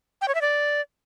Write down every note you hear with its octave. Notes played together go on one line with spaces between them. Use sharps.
G5
C#5
E5
D5